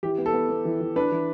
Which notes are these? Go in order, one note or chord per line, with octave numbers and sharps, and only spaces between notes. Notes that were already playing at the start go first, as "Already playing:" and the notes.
E3 G4
B3
A4
B3
B3
E3
E3
D4 B4
E3